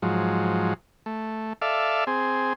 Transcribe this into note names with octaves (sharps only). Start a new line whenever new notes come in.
G#2 F3 F#3
A3
A4 D5 E5 F5
C4 G#4